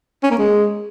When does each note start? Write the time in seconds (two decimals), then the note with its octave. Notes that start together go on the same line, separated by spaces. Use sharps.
0.23 C#4
0.31 A#3
0.38 G#3